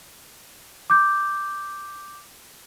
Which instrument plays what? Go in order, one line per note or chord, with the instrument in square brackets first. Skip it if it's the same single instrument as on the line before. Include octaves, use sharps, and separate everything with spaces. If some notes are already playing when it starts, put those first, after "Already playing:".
[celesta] D6 G6